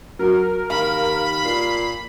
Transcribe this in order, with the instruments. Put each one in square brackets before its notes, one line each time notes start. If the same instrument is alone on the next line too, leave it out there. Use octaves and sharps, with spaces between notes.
[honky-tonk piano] F#3 F#4 [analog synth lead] A#4
[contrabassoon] D#2 [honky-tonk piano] F5 [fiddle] B5
[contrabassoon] A#2 [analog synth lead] C7